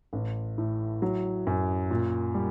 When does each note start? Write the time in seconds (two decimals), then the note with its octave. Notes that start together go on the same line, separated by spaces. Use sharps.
0.13 A1
0.58 A2
1.02 F#3
1.47 F#2
1.91 A#2
2.34 G3